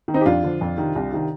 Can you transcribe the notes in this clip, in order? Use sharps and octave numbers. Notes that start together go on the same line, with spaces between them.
D#3
C4 D#4
G4
F2 D4 F4
D3 F3
F2
C3 D#3
C2
C3 D#3